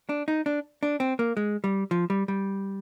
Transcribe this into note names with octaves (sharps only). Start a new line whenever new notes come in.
D4
D#4
D4
D4
C4
A#3
G#3
G3
F3
G3
G3